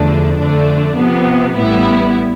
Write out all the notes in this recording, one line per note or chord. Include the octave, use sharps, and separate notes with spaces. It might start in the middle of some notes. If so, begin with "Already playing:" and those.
Already playing: E2 D3 F3 A3 D4
F2 D3 A3 D4
C3 F3 B3
A1 A2 G3 B3 E4